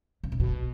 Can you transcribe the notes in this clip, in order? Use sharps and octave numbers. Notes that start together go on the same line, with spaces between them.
C#3
C3
B2